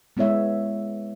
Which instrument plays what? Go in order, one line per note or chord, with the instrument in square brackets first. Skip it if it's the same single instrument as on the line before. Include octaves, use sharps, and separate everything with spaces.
[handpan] G#3 B3 E4 C#5 E5